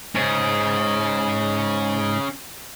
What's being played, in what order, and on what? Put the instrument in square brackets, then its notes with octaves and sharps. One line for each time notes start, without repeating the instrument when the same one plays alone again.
[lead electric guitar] G#2 [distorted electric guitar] C#4 G#4